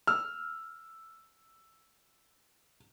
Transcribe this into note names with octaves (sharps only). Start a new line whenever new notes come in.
E6 F6